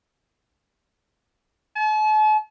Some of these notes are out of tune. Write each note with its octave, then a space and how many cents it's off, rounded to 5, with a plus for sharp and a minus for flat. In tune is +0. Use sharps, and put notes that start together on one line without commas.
A5 -45